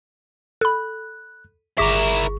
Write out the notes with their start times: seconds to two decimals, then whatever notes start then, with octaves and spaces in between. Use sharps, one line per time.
0.61 A4 B5 F#6
1.78 G1 E4 G#4 A#4 C#6 D6 A#6 B6